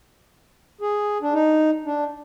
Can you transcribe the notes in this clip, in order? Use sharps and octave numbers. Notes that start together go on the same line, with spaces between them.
G#4
D4
D#4
D4